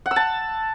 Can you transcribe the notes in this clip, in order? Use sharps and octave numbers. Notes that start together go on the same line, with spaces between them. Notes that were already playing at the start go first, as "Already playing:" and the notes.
F#5
E6
A5